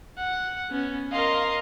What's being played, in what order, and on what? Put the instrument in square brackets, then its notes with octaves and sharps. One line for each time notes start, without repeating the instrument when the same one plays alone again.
[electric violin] F#5
B3 C#4
[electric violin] A#4 D#5 [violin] F5 C6